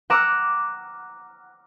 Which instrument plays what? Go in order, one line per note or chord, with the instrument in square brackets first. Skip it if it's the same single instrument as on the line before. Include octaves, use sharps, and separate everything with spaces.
[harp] F#5 A#5 D6 E6 F6